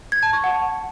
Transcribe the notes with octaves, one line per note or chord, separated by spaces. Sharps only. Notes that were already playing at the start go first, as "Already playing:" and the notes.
G#6
A5
C#6
F#5